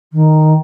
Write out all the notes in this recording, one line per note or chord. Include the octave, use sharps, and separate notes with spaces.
D#3